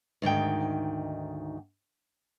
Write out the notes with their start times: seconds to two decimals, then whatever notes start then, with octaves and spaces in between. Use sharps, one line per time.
0.22 D2 G#2 D#3 G5